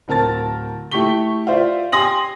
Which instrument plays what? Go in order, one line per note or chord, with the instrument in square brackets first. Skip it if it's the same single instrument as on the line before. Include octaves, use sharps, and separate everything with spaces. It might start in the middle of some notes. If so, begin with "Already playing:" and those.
[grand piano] D1 C4 A#4 A5 A6
A3 E4 G4 C#6 B6 G7
F4 C5 D5 E5 F5
G4 G#5 C6 D#6 A#6 F#7